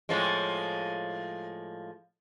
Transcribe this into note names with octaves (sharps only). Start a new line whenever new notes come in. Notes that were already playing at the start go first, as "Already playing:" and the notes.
A2 F3 G#3